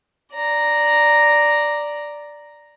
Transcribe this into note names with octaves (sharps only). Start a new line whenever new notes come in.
D5 A#5